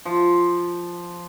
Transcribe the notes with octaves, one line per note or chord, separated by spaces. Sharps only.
F3